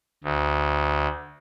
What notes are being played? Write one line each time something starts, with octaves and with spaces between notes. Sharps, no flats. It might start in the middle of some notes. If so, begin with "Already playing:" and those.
D2